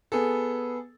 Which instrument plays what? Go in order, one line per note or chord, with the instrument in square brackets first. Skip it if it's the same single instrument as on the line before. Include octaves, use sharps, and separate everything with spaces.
[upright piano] B3 G#4 A4